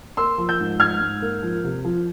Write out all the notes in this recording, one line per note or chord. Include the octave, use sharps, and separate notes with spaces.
A#3 C6 E6
F3
E6 G6
G#2
G#2 F6 G#6
G#2
A#3
F3
C3
F3